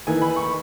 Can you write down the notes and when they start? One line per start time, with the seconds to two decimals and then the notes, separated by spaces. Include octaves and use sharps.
0.07 E3 A#3 D#4 G#5
0.22 B5
0.36 C#6